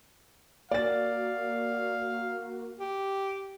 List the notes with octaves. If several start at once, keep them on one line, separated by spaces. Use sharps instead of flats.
A#3 F#4 D5 F5 A6
G4